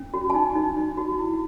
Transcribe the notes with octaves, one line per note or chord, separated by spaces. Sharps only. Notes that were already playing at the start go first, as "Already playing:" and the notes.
Already playing: C#4
F#4
A5
D#4 G#5
D#4
D#4
F#4
E4